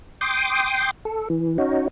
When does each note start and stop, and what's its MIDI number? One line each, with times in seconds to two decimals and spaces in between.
0.21 0.91 79
0.21 0.91 84
0.21 0.91 86
0.21 0.91 87
1.05 1.28 69
1.30 1.57 52
1.58 1.88 61
1.58 1.88 63
1.58 1.88 66